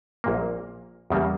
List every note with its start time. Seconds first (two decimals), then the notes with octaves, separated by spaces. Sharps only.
0.24 A#1 A#2 A#3
1.10 E2 C#3 G3 A#3